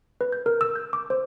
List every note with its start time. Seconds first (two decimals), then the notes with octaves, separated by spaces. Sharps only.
0.21 B4
0.32 G6
0.46 A#4
0.61 E6
0.76 G6
0.93 D6
1.10 C5